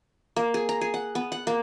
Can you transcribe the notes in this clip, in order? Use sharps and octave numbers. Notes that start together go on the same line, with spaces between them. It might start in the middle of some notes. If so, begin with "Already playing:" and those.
A#3
G#4
A#5
G#4
F#5
B3
F#5
A#3